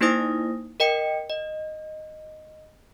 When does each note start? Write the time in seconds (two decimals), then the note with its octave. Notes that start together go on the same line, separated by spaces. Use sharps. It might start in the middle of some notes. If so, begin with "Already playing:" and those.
0.01 A#3 D#4 E4 C5 D#6 A#6
0.80 A#4 D#5 G5 C#7
1.30 D#5